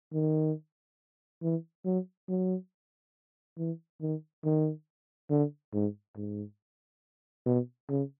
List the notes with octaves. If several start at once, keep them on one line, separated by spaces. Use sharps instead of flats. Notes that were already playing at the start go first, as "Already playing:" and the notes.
D#3
E3
F#3
F#3
E3
D#3
D#3
D3
G#2
G#2
B2
C#3